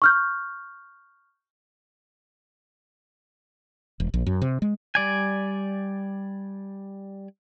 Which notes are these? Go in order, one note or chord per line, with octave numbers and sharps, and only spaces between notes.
C#6 F6 G6
E1
A#1
F#2
C3
G#3
G3 D5 G#5